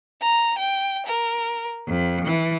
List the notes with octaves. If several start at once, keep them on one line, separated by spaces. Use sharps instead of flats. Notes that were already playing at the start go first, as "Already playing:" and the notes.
A#5
G5
A#4
F2
E3